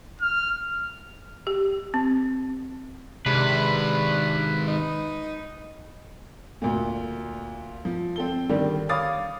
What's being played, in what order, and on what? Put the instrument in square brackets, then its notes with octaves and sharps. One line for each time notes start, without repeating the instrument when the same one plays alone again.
[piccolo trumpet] F6
[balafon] G4
C4
[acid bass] C3 [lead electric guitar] D#3 G#3 [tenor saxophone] D4 [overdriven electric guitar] B4
[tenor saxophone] D#4
[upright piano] D2 A#2
F3
C4 A4 G7
D3 D#3 G3
C#5 F5 B5 D6 D#6 A6